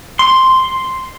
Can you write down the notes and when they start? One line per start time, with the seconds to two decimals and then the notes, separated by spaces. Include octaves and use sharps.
0.19 C6